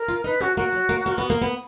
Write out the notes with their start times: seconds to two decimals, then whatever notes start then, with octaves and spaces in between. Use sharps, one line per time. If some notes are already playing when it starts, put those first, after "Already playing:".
Already playing: A#4
0.08 F4
0.24 D#4 B4
0.41 C#4 F#4
0.57 A#3 F#4
0.73 F#3
0.89 A#3
1.06 A#3
1.18 B3
1.30 A#3
1.42 B3